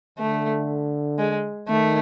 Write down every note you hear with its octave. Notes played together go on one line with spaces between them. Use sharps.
D3 A3
G#3
D#3 A3